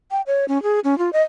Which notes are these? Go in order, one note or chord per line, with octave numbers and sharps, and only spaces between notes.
G5
C#5
C#4
G#4
C#4
F4
D#5